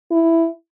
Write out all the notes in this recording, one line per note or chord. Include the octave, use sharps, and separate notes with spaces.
E4